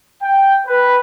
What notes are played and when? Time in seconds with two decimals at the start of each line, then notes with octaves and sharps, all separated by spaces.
0.23 G5
0.67 B4